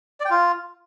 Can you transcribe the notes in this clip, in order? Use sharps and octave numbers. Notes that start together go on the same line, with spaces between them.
D5
G5
F4